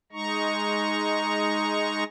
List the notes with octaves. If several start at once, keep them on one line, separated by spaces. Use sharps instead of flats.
G#3 D#4 A#5 C#6